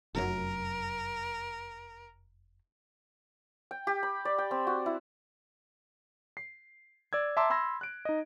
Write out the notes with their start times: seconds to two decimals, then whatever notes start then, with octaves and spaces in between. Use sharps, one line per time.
0.15 F1 F#2 F#3 A#4
3.71 G5
3.87 G4
4.03 B5
4.25 D5
4.38 G5
4.51 C4
4.67 F#4
4.86 E4
6.37 C7
7.13 D5 E6 G#6
7.37 E5 A5 A#5 C6 D6 E6
7.50 B5 C6 E6 G#6 A#6
7.81 F#6 D7
8.05 D#4 D#5